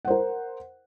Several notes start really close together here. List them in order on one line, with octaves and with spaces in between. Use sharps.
F#5 C5 A#4